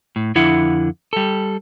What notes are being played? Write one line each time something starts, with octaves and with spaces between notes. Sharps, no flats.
A2
F2 D3 E4 F#5
G3 A4